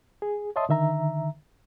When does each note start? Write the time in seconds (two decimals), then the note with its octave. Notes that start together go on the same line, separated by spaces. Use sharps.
0.22 G#4
0.56 C#5 D#5 E5 A5 C6 D#6
0.69 D3 D#3 E5 A#5